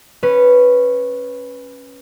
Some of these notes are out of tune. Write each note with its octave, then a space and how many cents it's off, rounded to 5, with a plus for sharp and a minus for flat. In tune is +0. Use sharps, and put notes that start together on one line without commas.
C#4 -10 B4 +0